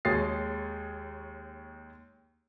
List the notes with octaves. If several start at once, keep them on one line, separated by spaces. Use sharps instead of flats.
D#2 G#3 G#4 C#5 A6 C7